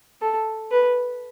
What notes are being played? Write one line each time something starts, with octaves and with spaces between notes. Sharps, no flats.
A4
B4